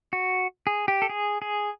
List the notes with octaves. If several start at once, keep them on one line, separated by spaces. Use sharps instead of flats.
F#4
G#4
G4
A4
G#4
G#4